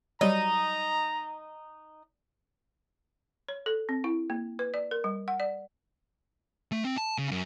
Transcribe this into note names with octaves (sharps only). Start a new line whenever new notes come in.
F#3 G3 D#4 A#5
C#5
A4
C4
E4
A#3
B4
D5
A#4
G3
F#5
D5
A3
C4
A5
C#3
F#2